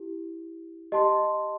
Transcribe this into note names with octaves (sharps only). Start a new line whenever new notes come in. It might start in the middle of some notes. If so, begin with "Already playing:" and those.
Already playing: E4 G4
G4 D#5 A5 C6